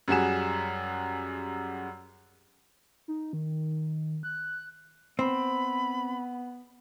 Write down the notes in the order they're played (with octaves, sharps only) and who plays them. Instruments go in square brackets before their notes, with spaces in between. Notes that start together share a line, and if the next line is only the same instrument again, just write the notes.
[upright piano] F#2 G3 F#4 G#4 E7
[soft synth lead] D#4
D#3
F#6
[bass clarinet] B3 [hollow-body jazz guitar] C4 [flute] B5